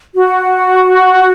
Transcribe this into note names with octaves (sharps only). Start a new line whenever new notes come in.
F#4